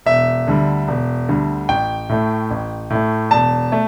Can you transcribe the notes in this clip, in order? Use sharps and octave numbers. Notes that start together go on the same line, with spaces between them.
E1 E5
D2 D3 G3
E1
D2 D3 G3
A1 G5
A2 A3
A1
A2 A3
E1 A5
A3